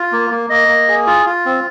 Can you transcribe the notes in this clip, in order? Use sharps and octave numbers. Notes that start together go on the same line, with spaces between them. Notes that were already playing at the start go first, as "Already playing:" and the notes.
Already playing: F4
A#3
A#3
A#3 D#5
A#3
G#4
F4
F4
C4